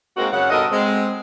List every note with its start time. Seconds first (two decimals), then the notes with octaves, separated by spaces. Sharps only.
0.17 G#3 A#3 C4 D#4 F#4 A#4
0.33 F#2 C#3 F#5
0.50 G2 B2 A4 A#4 D#5
0.72 G#3 C4